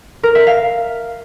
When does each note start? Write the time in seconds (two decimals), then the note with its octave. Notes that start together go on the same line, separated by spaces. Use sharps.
0.23 A#4
0.35 E5
0.47 F5